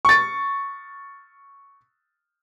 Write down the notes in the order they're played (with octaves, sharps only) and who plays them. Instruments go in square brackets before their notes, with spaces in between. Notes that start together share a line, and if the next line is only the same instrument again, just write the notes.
[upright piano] C#6 A6